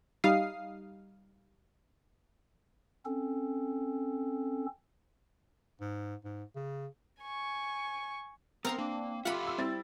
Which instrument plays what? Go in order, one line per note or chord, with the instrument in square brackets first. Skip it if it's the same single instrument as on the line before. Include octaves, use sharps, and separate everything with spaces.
[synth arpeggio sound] G3 D#4 F5 D#6 C7
[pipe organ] C4 C#4 A4
[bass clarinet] G#2
G#2
C#3
[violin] G#5 C#6
[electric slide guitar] B3 [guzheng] C4 A#5 C6 [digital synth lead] A#4
[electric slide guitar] A#3 [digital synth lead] D4
[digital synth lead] F4 [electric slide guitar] G4 A4 E5 [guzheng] F#5 B5
[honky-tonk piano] C6 E6
[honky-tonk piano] G3 E4 A6 [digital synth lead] C4